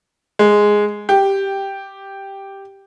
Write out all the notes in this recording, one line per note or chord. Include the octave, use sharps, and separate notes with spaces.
G#3
G4